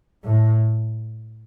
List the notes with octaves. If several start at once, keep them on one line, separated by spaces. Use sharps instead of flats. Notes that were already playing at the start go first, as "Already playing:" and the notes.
A2